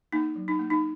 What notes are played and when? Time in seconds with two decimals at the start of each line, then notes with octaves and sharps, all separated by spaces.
0.12 A#3 D#4
0.35 F#3
0.48 D#4
0.59 A#3
0.70 D#4